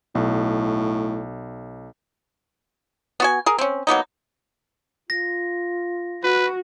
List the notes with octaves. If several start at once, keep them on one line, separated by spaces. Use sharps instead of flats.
B1 A2
B3 F#4 G#5
G#4 A#4
C4 C#4
F#3 A#3 B3 D#4
F4 A#6
F#4 B4